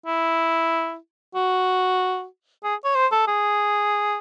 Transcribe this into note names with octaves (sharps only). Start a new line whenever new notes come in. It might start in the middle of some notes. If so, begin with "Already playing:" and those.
E4
F#4
G#4
C#5
C5
A4
G#4